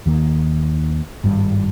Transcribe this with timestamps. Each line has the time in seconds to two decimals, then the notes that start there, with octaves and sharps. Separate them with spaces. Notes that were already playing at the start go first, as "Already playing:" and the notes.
0.06 D#2 D#3 A#3
1.24 G#1 G2 G3